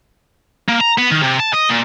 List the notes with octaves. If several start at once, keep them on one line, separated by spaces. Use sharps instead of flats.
A#3
A#5
B3
D#3
C3
A5
D#5
A#2